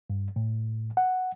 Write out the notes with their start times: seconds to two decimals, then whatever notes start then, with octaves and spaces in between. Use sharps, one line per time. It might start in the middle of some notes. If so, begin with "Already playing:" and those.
0.10 G2
0.36 A2
0.97 F#5